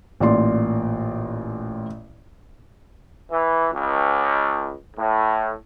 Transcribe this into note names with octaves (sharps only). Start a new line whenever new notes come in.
A1 A#2 D5 C6
E3
C#2
A2